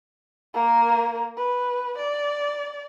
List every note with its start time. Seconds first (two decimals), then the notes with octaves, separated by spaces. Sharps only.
0.54 A#3 A#4
1.38 B4
1.98 D5